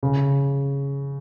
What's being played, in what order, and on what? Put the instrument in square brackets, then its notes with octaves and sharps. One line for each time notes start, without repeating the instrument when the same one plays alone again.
[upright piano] C#3